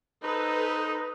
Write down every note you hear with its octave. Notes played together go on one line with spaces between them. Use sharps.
D#4 A4 B4 C5 D#6